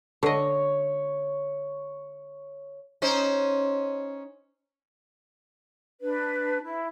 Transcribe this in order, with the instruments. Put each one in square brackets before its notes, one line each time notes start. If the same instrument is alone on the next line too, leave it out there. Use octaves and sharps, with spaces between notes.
[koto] D3 D#5 [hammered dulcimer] C#5
[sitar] C#4 D#4 C5
[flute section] D4 B4
E4